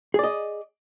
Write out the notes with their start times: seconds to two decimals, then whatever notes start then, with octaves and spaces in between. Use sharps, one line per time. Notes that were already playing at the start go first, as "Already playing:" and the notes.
0.14 G#4
0.19 D5
0.24 D#5